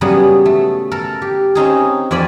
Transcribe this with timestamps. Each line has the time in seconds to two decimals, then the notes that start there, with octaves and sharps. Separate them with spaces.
0.01 C#3 F#3 G3 B3 G#4
0.45 A3
0.91 A4 A#4
1.22 G4
1.55 C4 C#4 D#4 G#4
2.11 F2 C4 F4 D5 G#5 B5